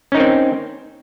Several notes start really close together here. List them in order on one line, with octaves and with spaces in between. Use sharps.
C#4 D#4 A#4 C4